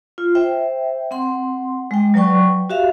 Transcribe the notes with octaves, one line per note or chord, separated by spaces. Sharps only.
F4
C5 E5 G5
C4 F#5 C6
G#3 G5
F#3 B4 D5 G5 C#6
F#4 G4 E5 F5